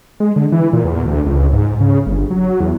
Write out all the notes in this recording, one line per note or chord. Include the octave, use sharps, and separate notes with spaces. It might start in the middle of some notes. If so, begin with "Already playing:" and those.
G#3
D3
E3
A#2
E2
D2
C#2
G#2
C#3
G1
F#3
E2